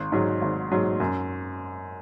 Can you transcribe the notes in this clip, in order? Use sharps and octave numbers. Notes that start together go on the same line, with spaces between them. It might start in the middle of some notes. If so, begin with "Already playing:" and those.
Already playing: G#1
G#2 F#3
G#1
G#2 F#3
F#2